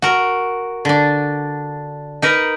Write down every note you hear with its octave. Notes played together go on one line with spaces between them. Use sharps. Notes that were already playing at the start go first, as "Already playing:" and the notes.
F#4 A#4
D3 D4
D#4 A#4 B4